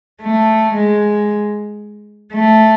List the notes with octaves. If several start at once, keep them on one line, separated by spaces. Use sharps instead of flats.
A3
G#3
A3